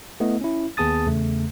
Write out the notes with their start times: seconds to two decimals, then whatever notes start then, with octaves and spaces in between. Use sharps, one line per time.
0.20 A3 B3 E4 D#5
0.41 C#4 E4
0.77 D#2 B3 G#4 A5 D#6 A6
1.06 E2 C#3 A3